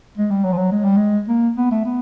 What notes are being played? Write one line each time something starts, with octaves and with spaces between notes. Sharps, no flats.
G#3
G3
F#3
F3
F#3
G#3
G3
G#3
A#3
B3
A3
B3